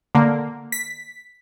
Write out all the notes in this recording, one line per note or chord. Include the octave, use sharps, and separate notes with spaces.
D3 A#3
B6